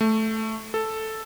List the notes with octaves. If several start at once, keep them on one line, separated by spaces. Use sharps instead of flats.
A3
A4